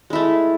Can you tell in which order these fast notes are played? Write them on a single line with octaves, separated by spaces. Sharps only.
G#3 E4 A3